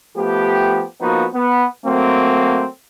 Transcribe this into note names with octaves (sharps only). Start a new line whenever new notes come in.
F3 A3 B3 G4
F3 A#3 B3 D#4 F#4
B3
F#3 A3 A#3 C4